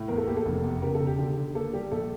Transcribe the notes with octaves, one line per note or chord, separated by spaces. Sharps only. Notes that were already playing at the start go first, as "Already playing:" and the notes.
Already playing: A2
E2 A#4
A4
A#3 G4
A4
F1
E2
C#3 G4 A#4
A4
E1
G4
D3 G4
D3
A#3 A4
G3 G4
A#1 A4